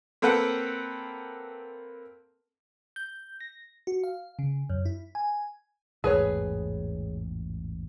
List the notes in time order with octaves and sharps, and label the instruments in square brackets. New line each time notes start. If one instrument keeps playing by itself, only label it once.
[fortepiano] A#3 C4 A4 B4 F#5 G5
[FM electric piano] G6
A#6
F#4
F5
C#3
F#2
E4
G#5
[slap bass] A1 E2 G#2 [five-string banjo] G#4 B4 C#5